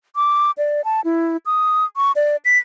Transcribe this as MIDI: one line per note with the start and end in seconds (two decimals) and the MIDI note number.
0.16 0.51 86
0.58 0.81 74
0.85 1.01 81
1.05 1.37 64
1.46 1.85 87
1.97 2.12 85
2.16 2.36 74
2.45 2.58 95